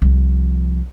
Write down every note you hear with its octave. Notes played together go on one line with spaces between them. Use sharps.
C2 F3